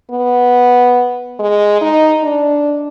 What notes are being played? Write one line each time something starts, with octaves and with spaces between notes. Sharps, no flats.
B3
G#3
D#4
D4